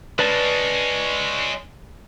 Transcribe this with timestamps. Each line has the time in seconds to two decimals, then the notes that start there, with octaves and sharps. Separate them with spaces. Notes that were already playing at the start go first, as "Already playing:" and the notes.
0.19 G#3 C#4 B4 D5 A5